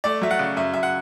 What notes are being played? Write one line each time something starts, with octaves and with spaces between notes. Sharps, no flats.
A3 D5
F#3 E5
F#5
C#3
F#2 E5
F#2 E5
F#5